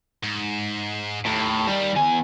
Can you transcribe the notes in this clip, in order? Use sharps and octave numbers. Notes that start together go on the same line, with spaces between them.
G#2
D#2 A2
G3
E2 G#5